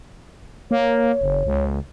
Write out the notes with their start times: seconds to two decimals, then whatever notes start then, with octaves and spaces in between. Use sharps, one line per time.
0.71 A#3 C#5
1.21 F#1
1.46 C#2